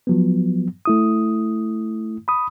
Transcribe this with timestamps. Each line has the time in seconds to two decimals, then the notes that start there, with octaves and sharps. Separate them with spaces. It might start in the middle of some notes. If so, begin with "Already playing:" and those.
0.07 F3 F#3 B3
0.85 A3 E4 D#6
2.28 B5 D#6